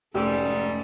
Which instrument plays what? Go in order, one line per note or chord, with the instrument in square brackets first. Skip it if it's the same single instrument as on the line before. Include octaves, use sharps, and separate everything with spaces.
[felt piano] F1 G4 E6 [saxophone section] G#2 G3 [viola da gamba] A3 [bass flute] C#4